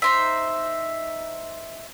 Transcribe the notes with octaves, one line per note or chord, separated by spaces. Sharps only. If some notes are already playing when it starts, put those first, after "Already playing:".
D#4 C5 E5